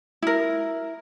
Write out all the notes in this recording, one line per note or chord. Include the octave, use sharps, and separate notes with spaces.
E4 A#4